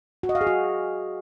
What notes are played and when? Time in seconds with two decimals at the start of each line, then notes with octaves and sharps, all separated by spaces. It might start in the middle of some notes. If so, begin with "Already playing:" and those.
0.23 F#4
0.29 D#5
0.35 F5
0.41 G#4
0.47 F#4